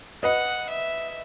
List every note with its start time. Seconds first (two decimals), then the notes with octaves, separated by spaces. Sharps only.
0.23 B4 D#5 F#5
0.70 E5